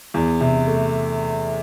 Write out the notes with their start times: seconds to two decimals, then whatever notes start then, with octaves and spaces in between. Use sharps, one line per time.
0.14 E2
0.41 C3
0.67 A3